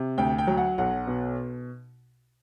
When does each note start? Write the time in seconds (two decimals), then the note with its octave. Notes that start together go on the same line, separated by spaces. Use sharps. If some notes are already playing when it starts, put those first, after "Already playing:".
Already playing: C3
0.18 D2 G5
0.38 G5
0.47 F#3
0.57 F#5
0.78 B1 F#5
1.07 B2